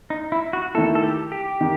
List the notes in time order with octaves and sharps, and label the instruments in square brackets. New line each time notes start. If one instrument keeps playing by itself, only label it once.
[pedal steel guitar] D#4
E4
F#4
[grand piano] D#3 A3 E4 [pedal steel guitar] A4
[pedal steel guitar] A4
G4
G4
[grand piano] D#3